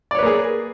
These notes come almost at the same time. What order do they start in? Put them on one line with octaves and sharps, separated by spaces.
D5 C#5 B4 A#3 G#4